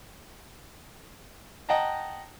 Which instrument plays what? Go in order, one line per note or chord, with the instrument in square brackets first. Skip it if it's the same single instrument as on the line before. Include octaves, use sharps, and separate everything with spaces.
[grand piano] D#5 F#5 G5 A5 A#5